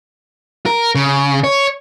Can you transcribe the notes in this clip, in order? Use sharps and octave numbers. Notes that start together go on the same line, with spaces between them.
A#4
C#3
C#5